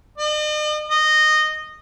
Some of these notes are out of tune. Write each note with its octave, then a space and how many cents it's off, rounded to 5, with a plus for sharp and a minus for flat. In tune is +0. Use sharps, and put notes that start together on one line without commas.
D#5 -45
D#5 -15